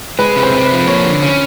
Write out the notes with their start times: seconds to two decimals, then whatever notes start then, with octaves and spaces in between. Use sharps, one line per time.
0.19 G#3 B4
0.36 C3
0.43 C5
0.53 C4
0.65 B4
0.71 F3
0.87 A#3 C#5
1.05 D3
1.23 C#4